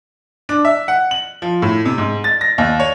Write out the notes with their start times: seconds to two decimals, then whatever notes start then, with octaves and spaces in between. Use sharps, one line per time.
0.49 D4
0.65 E5
0.88 F#5
1.11 F#7
1.42 F3
1.62 A2
1.86 C3
1.98 G#2
2.24 A6
2.41 A#6
2.58 D#2
2.80 C#5